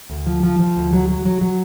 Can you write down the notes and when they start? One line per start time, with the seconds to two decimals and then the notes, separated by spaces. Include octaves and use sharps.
0.10 D2
0.26 F3
0.43 F3
0.59 F3
0.77 D2
0.93 F#3
1.08 F#3
1.25 F#3
1.41 F#3